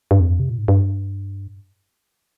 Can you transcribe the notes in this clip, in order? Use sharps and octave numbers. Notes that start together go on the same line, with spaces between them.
G2
F2
C3
A#2
G#2
G2